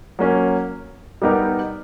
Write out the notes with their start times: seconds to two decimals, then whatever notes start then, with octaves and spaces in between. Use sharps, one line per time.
0.19 F#3 A#3 C#4
1.22 G3 B3 D#4 G4 A#4